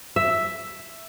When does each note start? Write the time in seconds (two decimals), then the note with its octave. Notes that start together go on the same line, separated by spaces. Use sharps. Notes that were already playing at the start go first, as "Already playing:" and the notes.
0.16 E5